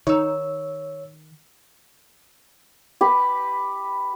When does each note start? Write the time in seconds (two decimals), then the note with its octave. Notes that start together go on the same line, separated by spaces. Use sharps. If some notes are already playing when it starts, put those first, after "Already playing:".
0.07 D#3 D#4 C#5 E6
3.01 G4 B4